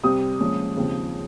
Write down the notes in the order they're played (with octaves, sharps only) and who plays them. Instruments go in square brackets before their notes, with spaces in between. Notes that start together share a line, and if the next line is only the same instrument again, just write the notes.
[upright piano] C3 G3 C4 D#6
A#2 F3 G#3 C#4
D#2 C#3 F3 C4